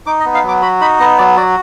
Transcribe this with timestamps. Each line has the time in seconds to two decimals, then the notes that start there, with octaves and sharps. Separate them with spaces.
0.06 D#4 D6
0.20 D#5
0.25 B3
0.34 F5
0.44 F#3 D6
0.62 F#4 B5
0.81 D#4 B5
1.00 B3 D#5
1.18 F#3 D5
1.36 F#4 D5